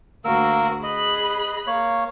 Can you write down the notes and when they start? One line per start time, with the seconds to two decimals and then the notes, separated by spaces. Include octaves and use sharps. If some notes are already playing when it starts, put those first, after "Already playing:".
0.25 D2 A#3 F#4 A#4 E6
0.83 G#4 D#5 B5 F#6
1.67 A#3 C#5